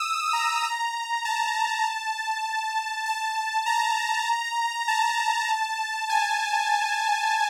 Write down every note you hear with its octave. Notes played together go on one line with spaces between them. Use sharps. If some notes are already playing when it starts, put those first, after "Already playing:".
Already playing: D#6 E6
A#5
A#5
A5
A5
A#5
A5
G#5